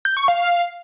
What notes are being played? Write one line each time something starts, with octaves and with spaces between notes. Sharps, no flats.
G6
C#6
F5